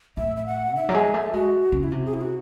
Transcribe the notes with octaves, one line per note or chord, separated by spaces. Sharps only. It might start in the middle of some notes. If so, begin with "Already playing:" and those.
A2 E5
E5
F#5
D#3 E5
F#3
G#3
A3
G#3 F#4
C#3
E4
C3 F#4
G#4
E4
F#4